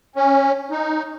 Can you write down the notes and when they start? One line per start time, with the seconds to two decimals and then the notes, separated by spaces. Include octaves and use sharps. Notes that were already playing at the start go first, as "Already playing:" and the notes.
0.16 C#4
0.71 D#4